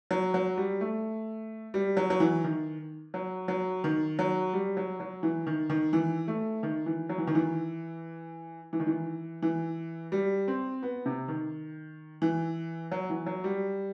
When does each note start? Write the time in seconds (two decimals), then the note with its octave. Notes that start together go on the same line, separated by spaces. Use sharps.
0.11 F#3
0.34 F#3
0.57 G3
0.81 A3
1.74 G3
1.97 F#3
2.10 F#3
2.20 E3
2.44 D#3
3.14 F#3
3.48 F#3
3.84 D#3
4.19 F#3
4.53 G3
4.77 F#3
5.00 F#3
5.23 E3
5.47 D#3
5.70 D#3
5.93 E3
6.28 A3
6.63 D#3
6.86 E3
7.09 F#3
7.18 E3
7.27 D#3
7.35 E3
8.73 E3
8.80 D#3
8.87 E3
9.42 E3
10.12 G3
10.48 C4
10.82 B3
11.06 C3
11.28 D#3
12.22 E3
12.92 F#3
13.10 E3
13.26 F#3
13.44 G3